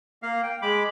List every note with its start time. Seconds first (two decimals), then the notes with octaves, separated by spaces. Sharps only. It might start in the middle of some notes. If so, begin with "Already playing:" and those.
0.23 A#3 F5
0.43 G5
0.62 G#3 B5 D6